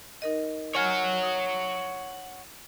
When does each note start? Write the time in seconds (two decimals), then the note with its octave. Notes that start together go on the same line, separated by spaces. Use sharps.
0.22 D#4 A#4 D#5
0.75 C#5 F#5 G#5 F6 G#6
1.22 D#6